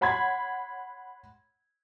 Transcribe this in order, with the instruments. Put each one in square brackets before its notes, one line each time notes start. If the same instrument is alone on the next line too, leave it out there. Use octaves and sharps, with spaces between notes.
[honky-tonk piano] C#5 F#5 B5 C6 G#6